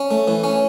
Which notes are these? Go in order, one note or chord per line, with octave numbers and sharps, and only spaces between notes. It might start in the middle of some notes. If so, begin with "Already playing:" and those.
Already playing: C#4
A3
E3
C#4